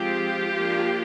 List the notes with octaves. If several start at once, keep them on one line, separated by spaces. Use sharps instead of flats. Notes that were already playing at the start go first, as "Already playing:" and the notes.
Already playing: F3 G#3 C4 F4 G4
F3 A#3 D4